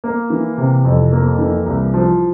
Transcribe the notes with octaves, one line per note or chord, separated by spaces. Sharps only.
A#3
E3
C3
F2
A#3
E3
C2
F3